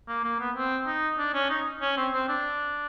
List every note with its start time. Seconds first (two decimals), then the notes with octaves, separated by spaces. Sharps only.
0.08 A#3
0.24 A#3
0.39 B3
0.56 C4
0.87 D#4
1.18 D4
1.34 C#4
1.50 D#4
1.81 C#4
1.97 C4
2.13 C4
2.28 D4